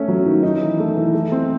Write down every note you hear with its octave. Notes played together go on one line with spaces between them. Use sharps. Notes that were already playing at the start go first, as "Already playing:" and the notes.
Already playing: A3 C#4
F#3
D#3
D#4
E3
A3
E3
A3
C4